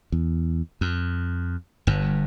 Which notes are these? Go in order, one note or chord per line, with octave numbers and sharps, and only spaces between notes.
E2
F2
G1 G2